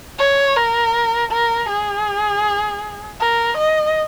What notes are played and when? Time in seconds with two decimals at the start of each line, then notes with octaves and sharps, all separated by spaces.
0.19 C#5
0.56 A#4
1.32 A#4
1.70 G#4
3.20 A#4
3.57 D#5